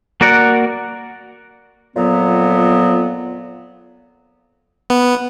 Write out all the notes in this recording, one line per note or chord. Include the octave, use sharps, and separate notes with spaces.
A#3 F#4 A#4 D5 F#5
F2 A#2 F#3 B3
B3